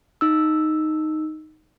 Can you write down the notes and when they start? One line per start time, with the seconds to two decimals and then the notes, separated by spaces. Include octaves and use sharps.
0.21 D#4 E6